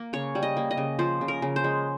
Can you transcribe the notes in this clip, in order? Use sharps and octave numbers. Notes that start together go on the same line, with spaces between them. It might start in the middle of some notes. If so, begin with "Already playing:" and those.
Already playing: A#3
C#3 C#5
G3
D#5
A#3
D#5
C#3
F3 C5
C#3
A#4
C#3
C5
G#3